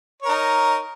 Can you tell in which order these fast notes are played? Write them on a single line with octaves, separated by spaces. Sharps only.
C#5 A#4 D#4